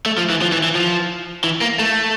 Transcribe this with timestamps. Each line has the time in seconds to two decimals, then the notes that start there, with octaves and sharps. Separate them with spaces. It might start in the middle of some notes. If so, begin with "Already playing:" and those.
0.06 A3
0.18 F3
0.30 E3
0.41 F3
0.52 E3
0.63 E3
0.75 F3
1.44 E3
1.61 A#3
1.79 A3